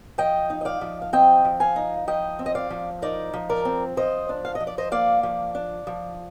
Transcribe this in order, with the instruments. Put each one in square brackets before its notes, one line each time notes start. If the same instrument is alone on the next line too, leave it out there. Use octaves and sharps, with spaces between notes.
[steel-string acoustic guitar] F3 D#5 G5
D#4
D#5
D5 F5
F3
F5
C4 D#5 G5
F3
F5 G#5
D#4
F3 D#5 G5
C4
D#5
D5 F5
F3
D#4 A#4 D5
F3
A#4 D5
C4
F3 C5 D#5
D4
F5
D#5
F3
D5
C5 D#5
A#3 D5 F5
F3
D4
F3